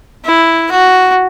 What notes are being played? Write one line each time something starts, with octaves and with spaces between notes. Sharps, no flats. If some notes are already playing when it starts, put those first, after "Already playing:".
E4
F#4